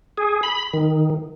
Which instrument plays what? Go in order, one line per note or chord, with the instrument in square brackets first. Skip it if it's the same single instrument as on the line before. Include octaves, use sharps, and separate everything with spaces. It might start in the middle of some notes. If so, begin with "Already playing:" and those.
[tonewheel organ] G#4
B5
D#3